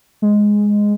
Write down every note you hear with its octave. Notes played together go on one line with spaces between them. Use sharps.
G#3